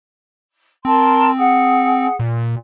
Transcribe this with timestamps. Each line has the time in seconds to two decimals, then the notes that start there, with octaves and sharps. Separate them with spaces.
0.85 C4 A#4 A5 C6
1.37 G#4 F#5
2.19 A#2